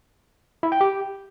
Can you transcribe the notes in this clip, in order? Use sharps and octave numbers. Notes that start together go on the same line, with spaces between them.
E4
G5
G4